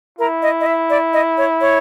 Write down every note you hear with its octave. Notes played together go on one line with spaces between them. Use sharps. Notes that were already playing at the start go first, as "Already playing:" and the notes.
E4 A#4
D#5
D#5
E5
D5
D#5
C#5
C#5